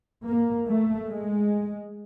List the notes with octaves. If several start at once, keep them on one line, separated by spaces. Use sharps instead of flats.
A#3
A3
G#3